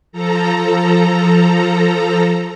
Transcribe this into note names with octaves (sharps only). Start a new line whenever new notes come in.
F3 A4 A#5